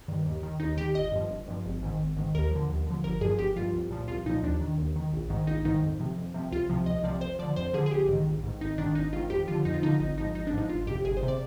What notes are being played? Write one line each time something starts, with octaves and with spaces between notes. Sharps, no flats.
G2 D#3
D#2
D#3
D#2 D#4
D#3 G4
G1 D#5
G2 F3
G1
G2 F3
G#1
G#2 D#3
G#1
G#2 D#3
D#2 A#4
D3 F3
D#2
D3 F3
G1 A#4
G2 F3 G#4
G1 G4
G2 F3 F4
C2
A#2 F3
C2 F4
A#2 F3 D#4
D#2 D4
D#3
D#2
D#3
A#1
G#2 D#3
A#1 D#4
G#2 D#3 D#4
F2
C3 F3
F2
C3 F3
C2 F4
C3 F3
C2 D#5
C3 F3 D5
F2 C5
D3 F3 D5
F2 C5
D3 F3 G#4
G#4
A#1 G4
G#2 D#3
A#1
G#2 D#3
G#1 D#4
G#2 D#3 D4
G#1 D#4
G#2 D#3 F4
F2 G4
D3 F3 F4
F2 D#4
F4
D3 F3 D#4
G#1 D#4
G#2 F3 D#4
G#1 D#4
D4
G#2 F3 D#4
G1 F4
F2 C3 G4
G1 G#4
C5
C3
D5